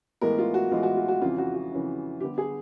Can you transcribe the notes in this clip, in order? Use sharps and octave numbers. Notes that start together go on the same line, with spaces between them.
A2 E3 G#3 B3 A#4
F4
F#4
A2 E3 G#3 B3 F4
F#4
F4
F#4
F2 C#3 E3 F4
F#4
F#4
F2 C#3 E3
D3 G3 B3 G4
G#4